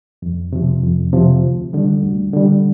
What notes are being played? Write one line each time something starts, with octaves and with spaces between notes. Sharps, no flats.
F2
C3 F3
F2
C3 F3
D2
D3 G3
D2
D3 G3